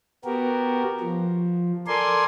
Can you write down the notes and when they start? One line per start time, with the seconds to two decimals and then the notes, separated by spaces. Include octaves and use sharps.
0.24 B3 F#4 G4 A#4
1.00 F3
1.87 A4 A#4 D5 G#5 C6